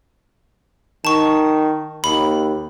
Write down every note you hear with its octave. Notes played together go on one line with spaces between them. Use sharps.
D#3 A5 C#6
D#2 B5